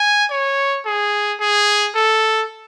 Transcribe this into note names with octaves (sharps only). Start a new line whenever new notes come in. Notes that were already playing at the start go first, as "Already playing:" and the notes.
Already playing: G#5
C#5
G#4
G#4
A4